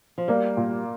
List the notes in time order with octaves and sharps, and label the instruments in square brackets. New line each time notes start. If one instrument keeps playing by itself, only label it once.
[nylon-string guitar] F3
[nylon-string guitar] G3 [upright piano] A#3
[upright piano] A#2